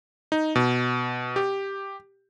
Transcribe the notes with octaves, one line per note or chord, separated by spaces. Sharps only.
D#4
B2
G4